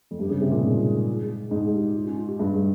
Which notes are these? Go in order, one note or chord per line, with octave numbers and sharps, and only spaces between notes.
F2
G2 G4
C#3 G#4
C3 G4
A#2 G#4
G#2
G#2 G#4
G4
F4
C#4
F4
G4
G2 G#4